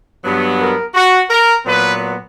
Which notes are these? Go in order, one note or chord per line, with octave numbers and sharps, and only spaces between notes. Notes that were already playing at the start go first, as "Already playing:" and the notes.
G2 F#3 B3
A#4
F#4
A#4
A#2 F#3 B3 B4